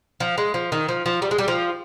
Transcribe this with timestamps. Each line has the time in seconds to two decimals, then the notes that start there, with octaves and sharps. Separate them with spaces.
0.20 F3
0.38 G#3
0.54 F3
0.72 D#3
0.89 F3
1.06 F3
1.22 G3
1.31 G#3
1.38 G3
1.48 F3